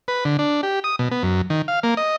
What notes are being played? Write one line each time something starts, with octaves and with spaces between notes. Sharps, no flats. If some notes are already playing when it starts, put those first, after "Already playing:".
B4
D3
D4
G4
D#6
B2
B3
F#2
D#3
F5
A#3
D#5